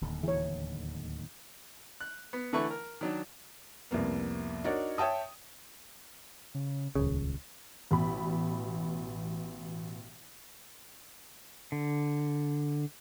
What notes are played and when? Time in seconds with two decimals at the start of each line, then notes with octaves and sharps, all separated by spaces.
0.01 D1 D#2 D3
0.24 E3 C#5
2.01 F#6
2.33 B3
2.53 D3 E3 A3 B4 C#6
2.70 A#4
3.01 D#3 F#3 D4
3.91 C2 F2 A#3 B3
4.64 D4 D#4 F#4 A#4 C#5 D5
4.98 C#5 E5 G5 A5 D#6
6.55 C#3
6.95 D#1 C#2 C#3
7.91 A1 B2 B5
11.72 D3